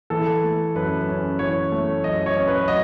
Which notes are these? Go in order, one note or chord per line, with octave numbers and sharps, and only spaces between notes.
E3 A4
A3
F#2 B4
C#4
E3 C#5
A3
F#2 D#5
C#5
C#4
B4
F#3 D#5